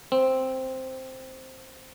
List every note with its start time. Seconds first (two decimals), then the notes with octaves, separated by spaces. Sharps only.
0.12 C4